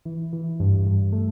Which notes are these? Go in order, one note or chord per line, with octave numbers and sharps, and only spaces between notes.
E3
E3
G2
G2
A3